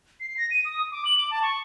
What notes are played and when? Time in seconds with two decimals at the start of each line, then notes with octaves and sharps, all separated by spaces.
0.20 C7
0.37 A#6
0.51 D#7
0.65 D#6
0.91 D6
1.05 F#7
1.18 D6
1.31 A5
1.42 C#6